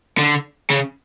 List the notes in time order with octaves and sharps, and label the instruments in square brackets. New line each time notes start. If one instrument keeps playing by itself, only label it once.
[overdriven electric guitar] D3
C#3